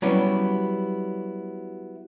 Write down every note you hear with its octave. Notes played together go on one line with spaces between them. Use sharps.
F#3 G3 B3 C#4 E4